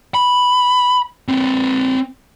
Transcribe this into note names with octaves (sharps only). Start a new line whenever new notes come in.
B5
C4 B4